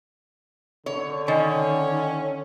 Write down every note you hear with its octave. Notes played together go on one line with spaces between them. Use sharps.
D3 C#5
D#3 C#4 C#5